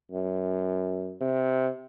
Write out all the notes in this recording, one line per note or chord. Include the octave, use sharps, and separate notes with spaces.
F#2
C3